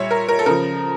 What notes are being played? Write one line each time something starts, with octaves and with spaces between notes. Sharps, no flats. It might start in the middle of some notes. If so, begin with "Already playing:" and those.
Already playing: A#2 G3 C#5 E5
A#4
A#4
A4
C#3 F3 A#4